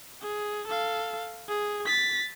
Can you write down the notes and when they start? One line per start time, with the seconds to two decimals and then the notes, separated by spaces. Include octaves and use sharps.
0.22 G#4
0.67 A4 F5
1.49 G#4
1.86 A6 B6